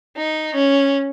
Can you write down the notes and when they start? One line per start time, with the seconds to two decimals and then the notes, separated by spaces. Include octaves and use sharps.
0.18 D#4
0.55 C#4